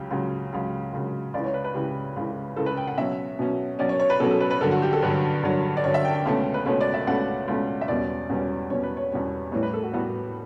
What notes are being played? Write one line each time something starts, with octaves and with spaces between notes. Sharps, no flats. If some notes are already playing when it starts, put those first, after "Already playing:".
Already playing: C#2 C#3 F#3 G4
C#2 C#3 F#3
C#2 C#3 F#3
C#2 C#3 F#3
C#2 C#3 E3 D5
C#5
B4
B4
C#2 C#3 E3 G4
C#2 C#3 E3
C#2 C#3 E3 A4
B4
G5
F#5
B2 F#3 C#4 E5
B2 F#3 C#4
B2 F#3 C#4 D5
C#5
C#5
B4
B2 F#3 C#4 A4
A4
B4
B4
G2 D3 F#3 A4
F#4
G4
A4
G2 D3 F#3 B4
G2 D3 F#3
D5
G2 D3 F#3 C#5
E5
G5
G5
C#2 B2 A3 C#4
B4
C#2 B2 A3 C#4 C#5
D5
E5
C#2 B2 A3 C#4 F#5
C#2 B2 A3 C#4
E5
E2 B2 G3 C#4 D5
E2 B2 G3 C#4
E2 B2 G3 C#4 C#5
B4
C#5
E2 B2 G3 C#4
A2 E3 G3 B3 C#5
B4
A4
F#4
A2 E3 G3 B3 F#4